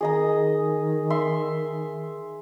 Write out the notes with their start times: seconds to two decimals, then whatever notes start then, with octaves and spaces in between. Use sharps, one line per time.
0.01 D#3 G#4 D#5 A#5
1.10 E5 C6